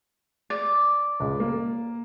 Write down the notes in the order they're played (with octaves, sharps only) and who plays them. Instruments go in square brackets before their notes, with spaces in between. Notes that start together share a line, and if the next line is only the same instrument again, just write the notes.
[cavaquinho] D5
[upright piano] C#2
A#3